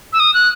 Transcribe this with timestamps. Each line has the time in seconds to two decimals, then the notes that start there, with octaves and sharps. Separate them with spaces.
0.13 E6
0.20 D#6
0.34 F#6